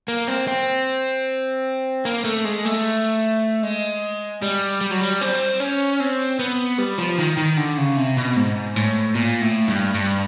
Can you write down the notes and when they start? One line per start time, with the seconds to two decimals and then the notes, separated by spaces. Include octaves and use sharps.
0.08 A#3
0.27 C4
0.48 C4
2.05 A#3
2.25 A3
2.45 G#3
2.65 A3
3.63 G#3
4.42 G3
4.81 G3
4.91 F#3
5.00 G3
5.21 C4
5.60 C#4
6.00 C4
6.39 B3
6.78 G3
6.98 F3
7.18 D#3
7.37 D#3
7.57 D3
7.78 C#3
7.97 C3
8.17 B2
8.36 G#2
8.76 A2
9.15 A#2
9.41 A2
9.68 G2
9.95 G2